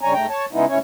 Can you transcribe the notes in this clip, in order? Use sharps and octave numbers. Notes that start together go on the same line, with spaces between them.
G2 C#3 G3 C#5 G#5 A#5
G#2 A3 G5 A#5
C#5 A5
C#3 G#3 B3 D#4 E4
D2 G#2 C#4 E4 C#5